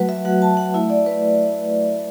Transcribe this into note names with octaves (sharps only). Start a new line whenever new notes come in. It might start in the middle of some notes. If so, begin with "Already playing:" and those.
Already playing: F#3 A3 F#4 B4 F#5
E5
F#3 A3 F#4 F#5
A5
F#5
A3 E4 E5
D5
B4